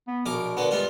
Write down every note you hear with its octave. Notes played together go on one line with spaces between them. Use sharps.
B3
A#1 B2 A#4 D6
D3 A#3 B3
G2 G#3 B3 F4